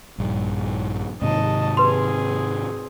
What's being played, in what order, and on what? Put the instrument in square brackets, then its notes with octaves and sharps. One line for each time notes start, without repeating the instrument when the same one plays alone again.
[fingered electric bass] A#1 G2
[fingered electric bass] G#2 C3 D#3 [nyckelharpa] D#5 A5
[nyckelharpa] C4 G#4 [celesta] B4 C6